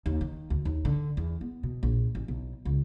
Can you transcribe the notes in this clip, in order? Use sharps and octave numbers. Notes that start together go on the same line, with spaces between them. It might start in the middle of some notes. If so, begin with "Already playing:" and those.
D#2
D#3
D2
D#2
D3
E2
B3
B2
A#1
A1
B1
C#2